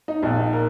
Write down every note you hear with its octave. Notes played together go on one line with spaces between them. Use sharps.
D#4
A#1 A#2 D#4
D#4
A#4